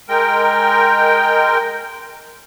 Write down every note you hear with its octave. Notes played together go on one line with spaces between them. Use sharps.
G#3 A#4 G5